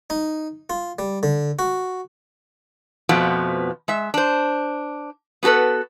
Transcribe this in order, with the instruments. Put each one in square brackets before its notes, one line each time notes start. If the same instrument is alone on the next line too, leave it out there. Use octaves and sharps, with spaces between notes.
[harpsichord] D#4
F4
G3
D3
F#4
[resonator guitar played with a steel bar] F2 B2 F3 A3 B3
G#3 E5
D4 C5
B3 F#4 G4 A4 B4